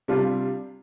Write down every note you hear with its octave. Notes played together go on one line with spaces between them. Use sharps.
C3 G3 D4 F4